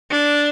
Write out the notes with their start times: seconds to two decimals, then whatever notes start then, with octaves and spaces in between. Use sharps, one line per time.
0.11 D4